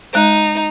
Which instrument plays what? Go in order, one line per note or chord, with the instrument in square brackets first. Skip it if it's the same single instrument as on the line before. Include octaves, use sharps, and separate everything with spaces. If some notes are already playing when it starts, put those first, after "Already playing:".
[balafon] G#3 [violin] D#4